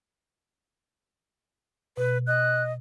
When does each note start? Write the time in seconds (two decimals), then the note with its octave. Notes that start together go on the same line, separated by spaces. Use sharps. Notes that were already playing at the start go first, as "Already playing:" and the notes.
1.97 B2 B4
2.27 D#5 F#6